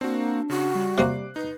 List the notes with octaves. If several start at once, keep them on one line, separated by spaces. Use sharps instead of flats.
A#3 C4 D4 F#4
C#3 F#4
G3
C3 A#3 C4 D6 F#6 C7
D#4 B4